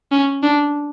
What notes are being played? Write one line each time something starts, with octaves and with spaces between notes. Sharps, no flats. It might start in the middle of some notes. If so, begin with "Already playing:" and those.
C#4
D4